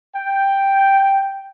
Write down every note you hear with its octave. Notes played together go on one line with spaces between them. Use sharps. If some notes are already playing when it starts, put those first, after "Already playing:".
G5